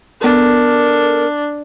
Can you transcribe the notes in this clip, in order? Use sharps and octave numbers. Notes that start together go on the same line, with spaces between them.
B3 D4 A4 A#4